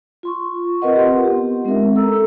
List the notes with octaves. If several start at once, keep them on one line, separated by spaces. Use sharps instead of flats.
F4 C6 C#6
C4 F4 A#4 B4 D#5 F#5
G4 F#5 C6
B3 G4
G#3 C4 C#4 D#4 A#4 E5
A4 A#5 E6